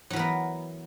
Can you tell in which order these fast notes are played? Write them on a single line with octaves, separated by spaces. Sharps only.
F#3 E3 A#4 B3